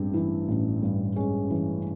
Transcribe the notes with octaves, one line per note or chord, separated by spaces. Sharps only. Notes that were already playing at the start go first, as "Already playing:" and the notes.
Already playing: A1 G2 G#3 C4 D4
E3 E4
A1
G2
G#3 C#4
E3